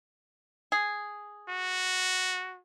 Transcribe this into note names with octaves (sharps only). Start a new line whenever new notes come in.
G#4
F#4